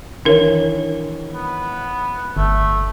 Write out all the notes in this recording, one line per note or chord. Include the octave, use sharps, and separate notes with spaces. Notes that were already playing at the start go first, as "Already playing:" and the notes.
D#3 E3 D4 A#4 C#5
B3
G1 A3